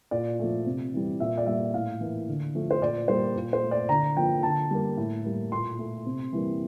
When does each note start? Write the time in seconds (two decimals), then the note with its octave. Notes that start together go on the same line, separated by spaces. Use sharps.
0.11 A#2 D5
0.39 F3 A3
0.66 C3
0.93 E3 G3
1.20 A#2 E5
1.38 D5
1.46 G3 A#3 E5
1.73 A2 F5
2.01 E3 A#3
2.28 D3
2.55 F3 A3
2.71 C5
2.81 A#2 D5
3.08 G3 A#3 C5
3.36 A#2
3.53 C5
3.63 A3
3.71 D5
3.89 D3 A#5
4.17 F3 A#3 G5
4.43 D3 A5
4.71 G3 A#3
4.97 A2
5.25 G3 A#3
5.52 A#2 C6
5.79 A3
6.06 C3
6.33 E3 G3 A#3